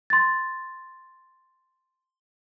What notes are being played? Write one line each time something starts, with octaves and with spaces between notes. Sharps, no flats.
C6 A6